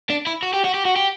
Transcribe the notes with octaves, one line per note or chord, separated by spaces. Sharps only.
D4
E4
F#4
G4
F#4
G4
F#4
G4